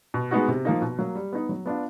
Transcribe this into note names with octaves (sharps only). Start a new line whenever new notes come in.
B2
G#3 B3 D#4 F#4
C3
F3 A#3 D#4
B2
F#3 A#3
G3
B3 D#4
F#3
B3 D4 F4